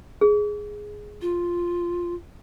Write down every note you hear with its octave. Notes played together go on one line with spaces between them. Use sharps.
G#4
F4